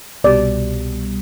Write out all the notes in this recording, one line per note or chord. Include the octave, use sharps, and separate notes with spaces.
C2 B2 G3 D5